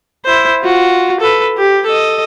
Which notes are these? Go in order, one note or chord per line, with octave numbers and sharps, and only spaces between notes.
E4 C5
F4 F#4
A4 B4
G4
A4 D#5